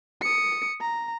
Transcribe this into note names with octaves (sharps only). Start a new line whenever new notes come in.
D#6 C#7
A#5